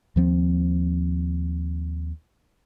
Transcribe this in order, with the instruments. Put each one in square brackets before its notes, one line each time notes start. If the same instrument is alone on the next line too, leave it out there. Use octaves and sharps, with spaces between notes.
[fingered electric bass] D#2 F3 C4